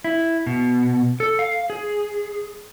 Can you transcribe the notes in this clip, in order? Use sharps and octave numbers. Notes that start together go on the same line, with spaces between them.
E4
B2
A4
F5
G#4